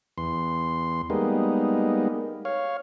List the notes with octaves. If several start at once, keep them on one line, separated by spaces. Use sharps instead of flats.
E2 C6
G3 G#3 A#3 B3 D#4
C#5 F5